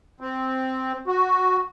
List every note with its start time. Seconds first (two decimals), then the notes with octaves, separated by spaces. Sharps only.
0.21 C4
1.07 F#4